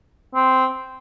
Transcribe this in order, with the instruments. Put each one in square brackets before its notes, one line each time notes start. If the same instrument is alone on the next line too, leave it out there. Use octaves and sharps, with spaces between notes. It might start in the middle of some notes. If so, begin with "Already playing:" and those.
[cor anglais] C4